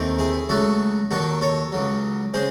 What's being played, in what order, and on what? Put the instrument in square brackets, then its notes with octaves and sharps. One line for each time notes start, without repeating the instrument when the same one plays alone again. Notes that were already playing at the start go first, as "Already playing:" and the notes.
Already playing: [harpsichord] D#2 D#3 A3 C4
E4 G#4
C#2 C#3 F#3 A3 F#4 A4
D#2 D#3 F#3 F#4 A4
A4 C#5
C#2 C#3 F#3
C#3 G#3 G#4 C5